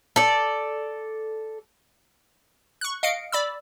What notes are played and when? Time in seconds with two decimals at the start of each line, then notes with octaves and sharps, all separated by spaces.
0.16 A4 D5
2.81 C#6 F#6
3.03 D#5 F5 C#7 D7
3.32 D5 B5 E6